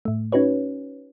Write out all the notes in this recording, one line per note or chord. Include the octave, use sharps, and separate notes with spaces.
A2 A3
C#4 D#4 F#4 B4 C#5